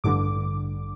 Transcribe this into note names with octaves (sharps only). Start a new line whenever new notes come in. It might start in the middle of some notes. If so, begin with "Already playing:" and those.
A1 G2 D3 D6